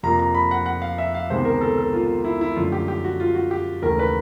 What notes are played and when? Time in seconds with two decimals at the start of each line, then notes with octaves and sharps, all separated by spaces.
0.03 F2 C3 F3 A#3 A#5
0.19 A#5
0.34 B5
0.51 F#5
0.66 F#5
0.82 F5
0.98 E5
1.14 F5
1.30 C#2 C3 D#3 G#3 B3 C5
1.45 A#4
1.61 A4
1.78 A4
1.93 F4
2.24 E4
2.41 E4
2.56 F#2 D3 F3 A3 F4
2.72 G4
2.88 G4
3.04 F#4
3.20 F4
3.35 F#4
3.51 G4
3.82 D#2 C#3 E3 A3 A#4
3.99 B4